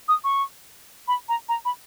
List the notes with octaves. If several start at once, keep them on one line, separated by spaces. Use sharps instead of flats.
D#6
C#6
B5
A#5
A#5
B5